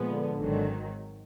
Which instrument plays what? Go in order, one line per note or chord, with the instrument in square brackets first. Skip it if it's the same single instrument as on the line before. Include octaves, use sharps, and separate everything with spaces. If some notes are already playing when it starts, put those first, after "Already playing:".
Already playing: [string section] A#2 F3 G#3 B3
[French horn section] D3
[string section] G#1 G#2 D#3 F#3